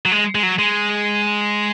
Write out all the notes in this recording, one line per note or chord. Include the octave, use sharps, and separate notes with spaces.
F#3
G#3
G#3
F#3
G#3